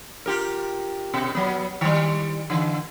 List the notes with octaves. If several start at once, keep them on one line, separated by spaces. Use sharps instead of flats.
F4 G4 A#4
B2
F#3 B3
D#3 G3
D3 E3